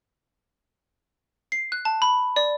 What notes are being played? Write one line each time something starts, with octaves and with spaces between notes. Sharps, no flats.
C7
F#6
A5
B5
D5